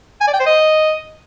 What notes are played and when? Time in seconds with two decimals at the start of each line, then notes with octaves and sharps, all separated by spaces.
0.21 G#5
0.27 D5
0.34 G5
0.40 C5
0.46 D#5